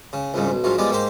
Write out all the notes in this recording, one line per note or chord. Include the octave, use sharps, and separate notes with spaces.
C#3
C2 F2 G#2 C#3
B1
A#1 G#2 F#3 F4
F3 G3 G#3 B3 D5
G#2 A#3 G4 C5